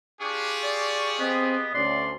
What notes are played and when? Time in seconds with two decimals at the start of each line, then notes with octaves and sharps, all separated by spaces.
0.21 D4 F4 G4 G#4 C#6
0.63 D5
1.20 B3 C4 D#5
1.74 D2 C#4 D5 C6